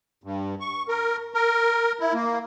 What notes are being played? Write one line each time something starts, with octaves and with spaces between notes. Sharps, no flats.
G2
C#6
A#4
A#4
E4
A#3